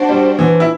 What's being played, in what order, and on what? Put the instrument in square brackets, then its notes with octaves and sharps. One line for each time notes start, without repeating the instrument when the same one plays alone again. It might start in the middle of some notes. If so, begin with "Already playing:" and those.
Already playing: [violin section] D4 F#4 C5
[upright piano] G3
E3
E4